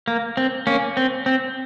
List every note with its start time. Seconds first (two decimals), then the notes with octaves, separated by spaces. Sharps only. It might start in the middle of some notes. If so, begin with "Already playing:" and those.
0.08 A#3
0.37 C4
0.67 A#3 C#4
0.97 C4
1.26 C4